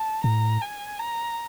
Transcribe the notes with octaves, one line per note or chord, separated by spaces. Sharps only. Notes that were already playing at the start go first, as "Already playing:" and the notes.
Already playing: A5
A2 A#5
G#5
A#5